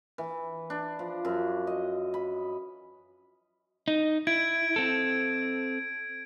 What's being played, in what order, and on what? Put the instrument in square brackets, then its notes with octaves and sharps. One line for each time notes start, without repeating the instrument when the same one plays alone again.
[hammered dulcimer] E3
D4
F3
F#2
D#5
B5
[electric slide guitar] D#4
[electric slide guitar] E4 [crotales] G#6 D7
[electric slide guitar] C4 A4